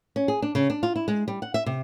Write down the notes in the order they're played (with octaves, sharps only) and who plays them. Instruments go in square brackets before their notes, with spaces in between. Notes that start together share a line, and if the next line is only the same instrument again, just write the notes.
[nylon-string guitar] C#4
G#4
D4
C#3
D4
F4
E4
G#3
G3
F#5
E5
C3